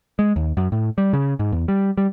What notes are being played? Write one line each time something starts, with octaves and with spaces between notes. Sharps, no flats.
G#3
D#2
F#2
A2
G3
C#3
G#2
E2
G3
G3